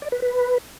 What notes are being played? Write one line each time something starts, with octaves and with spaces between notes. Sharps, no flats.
D5
B4
B4